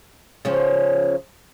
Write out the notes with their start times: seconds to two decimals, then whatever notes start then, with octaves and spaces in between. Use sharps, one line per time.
0.45 C#3 F3 C#4